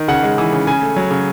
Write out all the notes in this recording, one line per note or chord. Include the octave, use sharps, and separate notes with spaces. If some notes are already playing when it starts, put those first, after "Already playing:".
Already playing: D#3
C#3 F#5
G#3
E3
C#3
C#3 G#5
A3
F#3
C#3